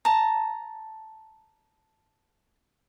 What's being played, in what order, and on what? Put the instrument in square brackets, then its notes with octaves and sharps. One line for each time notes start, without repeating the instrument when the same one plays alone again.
[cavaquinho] A5 A#5